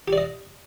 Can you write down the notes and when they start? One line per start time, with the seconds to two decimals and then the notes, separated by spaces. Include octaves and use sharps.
0.08 G4
0.13 D5
0.18 D#5